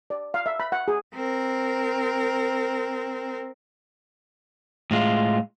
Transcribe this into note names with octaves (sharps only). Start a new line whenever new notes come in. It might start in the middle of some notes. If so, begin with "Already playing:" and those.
D5
F5
E5
B5
F#5
G#4
C4 A#4
A2 G#3 F4